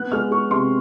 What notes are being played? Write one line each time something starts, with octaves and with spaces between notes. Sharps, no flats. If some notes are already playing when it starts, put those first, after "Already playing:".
Already playing: B3 F#6
G#3 F6
G#3 C#6
C3 C6